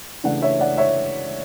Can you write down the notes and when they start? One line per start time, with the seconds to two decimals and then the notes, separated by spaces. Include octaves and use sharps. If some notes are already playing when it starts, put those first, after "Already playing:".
0.24 C#3 E3 A3 D4 D5 F#5
0.42 C#5 E5
0.60 D5 F#5
0.77 C#5 E5